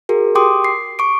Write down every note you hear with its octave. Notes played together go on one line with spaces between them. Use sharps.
F#4 G#4 A#4
G4 G5 C6 D6 D#6
C7
C#6 D6 D7